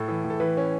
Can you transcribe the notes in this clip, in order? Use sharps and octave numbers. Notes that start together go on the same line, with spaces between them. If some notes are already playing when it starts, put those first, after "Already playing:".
Already playing: A2 A4
E3
A2
A4
E3 B4
C#4